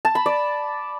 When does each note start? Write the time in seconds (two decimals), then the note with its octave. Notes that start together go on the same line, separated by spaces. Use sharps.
0.05 A5
0.15 B5
0.26 D5